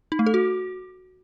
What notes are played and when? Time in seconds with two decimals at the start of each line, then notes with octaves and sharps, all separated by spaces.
0.12 D#4
0.19 A3
0.26 A4
0.34 F#4